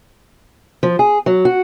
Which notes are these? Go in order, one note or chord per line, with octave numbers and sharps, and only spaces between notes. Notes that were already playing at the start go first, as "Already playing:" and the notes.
F3
G#4
F#3
F#4